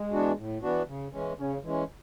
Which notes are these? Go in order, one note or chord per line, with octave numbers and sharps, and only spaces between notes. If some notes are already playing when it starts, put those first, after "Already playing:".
Already playing: G#3
E3 B3 D4 F#4
A2
E3 B3 D4 F#4
C#3
E3 G#3 C#4
C#3 C#4
E3 G#3 C#4